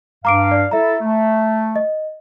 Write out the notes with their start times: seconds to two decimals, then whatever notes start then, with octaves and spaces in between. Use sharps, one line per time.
0.25 G2 F5 A#5 D6 D7
0.51 D5
0.71 E4 A4 E5 A#5
1.01 A3
1.76 D#5